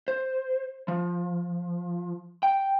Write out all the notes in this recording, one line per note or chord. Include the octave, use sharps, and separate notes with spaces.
C5
F3
G5